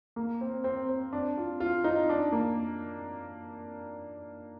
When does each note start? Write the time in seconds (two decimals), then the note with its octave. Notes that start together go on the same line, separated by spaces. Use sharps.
0.16 A#3
0.41 C4
0.64 C4
0.89 C4
1.13 D4
1.37 F4
1.60 F4
1.84 D#4
2.09 D4
2.32 A#3